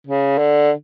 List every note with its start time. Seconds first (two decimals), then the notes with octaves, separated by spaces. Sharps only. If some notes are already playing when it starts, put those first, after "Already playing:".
0.07 C#3
0.38 D3